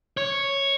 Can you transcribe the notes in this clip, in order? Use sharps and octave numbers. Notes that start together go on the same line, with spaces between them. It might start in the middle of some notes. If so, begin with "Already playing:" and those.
C#5